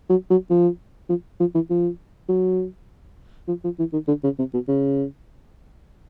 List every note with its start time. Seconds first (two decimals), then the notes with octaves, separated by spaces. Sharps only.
0.10 F#3
0.30 F#3
0.50 F3
1.09 F3
1.40 F3
1.55 E3
1.70 F3
2.29 F#3
3.48 F3
3.64 F3
3.79 E3
3.93 D#3
4.08 D3
4.24 C#3
4.39 C3
4.54 B2
4.68 C#3